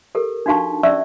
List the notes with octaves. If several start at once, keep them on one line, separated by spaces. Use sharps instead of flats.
G4 A4 A#4
D4 D#4 F#4 F5 A5 C#6
C#4 D5 E5 C#6 E6